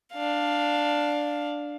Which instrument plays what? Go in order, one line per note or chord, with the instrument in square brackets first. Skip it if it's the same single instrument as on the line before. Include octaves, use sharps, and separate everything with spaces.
[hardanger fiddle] D4 F5